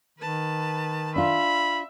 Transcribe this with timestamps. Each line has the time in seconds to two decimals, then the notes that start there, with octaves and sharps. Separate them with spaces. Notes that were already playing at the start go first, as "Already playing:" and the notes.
0.19 D#3 B4 A5
1.16 D4 F4 E5 B5